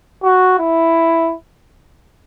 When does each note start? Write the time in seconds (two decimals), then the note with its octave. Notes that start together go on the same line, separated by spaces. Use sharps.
0.24 F#4
0.59 E4